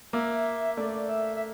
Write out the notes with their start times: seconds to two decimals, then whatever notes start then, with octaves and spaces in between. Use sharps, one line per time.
0.13 A#3 E5
0.77 A3 D5
1.09 E5
1.36 E5